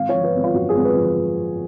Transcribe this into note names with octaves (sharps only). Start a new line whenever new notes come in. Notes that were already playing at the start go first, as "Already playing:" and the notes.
Already playing: G#1 F5
F3 C#5
B4
G#1
F4
F#2 F#4
G#4
G#1
B4
F3